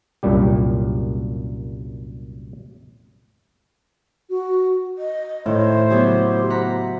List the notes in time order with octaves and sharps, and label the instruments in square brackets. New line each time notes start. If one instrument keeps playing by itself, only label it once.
[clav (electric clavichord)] C2 F#2 A#2 G3 G4
[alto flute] F#4
[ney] D#5
[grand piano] A2 [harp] D#3 [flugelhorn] C5 [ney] C#5
[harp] C#3 F#3 B3 [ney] G4
[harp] F#5 A#5 B5